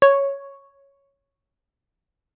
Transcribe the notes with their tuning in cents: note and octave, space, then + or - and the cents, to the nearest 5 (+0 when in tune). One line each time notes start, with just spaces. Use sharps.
C#5 +0